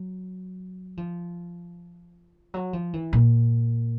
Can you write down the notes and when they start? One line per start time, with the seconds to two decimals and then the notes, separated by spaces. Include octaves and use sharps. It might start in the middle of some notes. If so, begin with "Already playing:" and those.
Already playing: F#3
0.97 F3
2.54 F#3
2.73 F3
2.93 E3
3.13 A#2